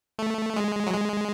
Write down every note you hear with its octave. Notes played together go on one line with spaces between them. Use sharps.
A3
G#3
F#3
G#3